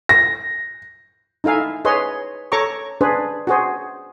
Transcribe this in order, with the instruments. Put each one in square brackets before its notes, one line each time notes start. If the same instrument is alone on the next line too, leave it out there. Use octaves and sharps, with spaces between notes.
[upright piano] A#6
[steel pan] D#4 E4 A4 F5 G#5
G#4 B4 C#5 D#5 C6
A4 C#5 A#5 C#6 D6
D4 G#4 B4 C5
F#4 G#4 C5